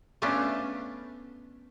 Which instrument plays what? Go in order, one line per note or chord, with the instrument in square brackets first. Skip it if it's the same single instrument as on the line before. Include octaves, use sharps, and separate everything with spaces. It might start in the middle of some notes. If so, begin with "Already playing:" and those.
[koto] A3 B3 C#4 D4 F4